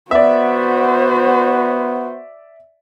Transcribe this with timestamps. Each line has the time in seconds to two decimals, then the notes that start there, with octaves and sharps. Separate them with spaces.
0.11 B3 F#4 C5 D5 E5